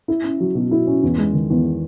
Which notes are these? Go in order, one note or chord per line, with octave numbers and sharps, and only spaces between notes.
E4
C#4
F#3
B2
E4
C#4
E2
G#3
D#3
E2